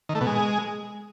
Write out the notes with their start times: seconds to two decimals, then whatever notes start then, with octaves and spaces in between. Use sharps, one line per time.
0.09 D#3
0.15 A3
0.21 B2
0.27 G#3